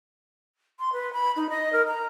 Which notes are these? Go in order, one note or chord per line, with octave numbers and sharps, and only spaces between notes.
C6
B4
B5
D#4
D#5
A#4
A#5